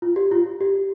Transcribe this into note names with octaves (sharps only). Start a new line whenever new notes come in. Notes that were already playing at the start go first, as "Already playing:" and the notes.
F4
G4
F4
G4